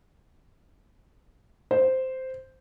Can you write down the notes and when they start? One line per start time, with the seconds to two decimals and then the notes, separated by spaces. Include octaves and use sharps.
1.71 C5